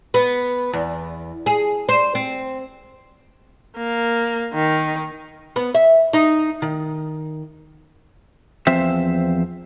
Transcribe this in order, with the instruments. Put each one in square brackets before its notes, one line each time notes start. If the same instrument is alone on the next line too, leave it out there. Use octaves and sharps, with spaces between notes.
[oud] B3
E2
G#4
C5
C4
[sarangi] A#3
D#3
[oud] B3
E5
D#4
D#3
[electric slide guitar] E2 F3 C4 C5 E5